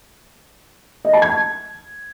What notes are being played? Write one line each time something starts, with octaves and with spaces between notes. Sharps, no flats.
D#5
A5
G#6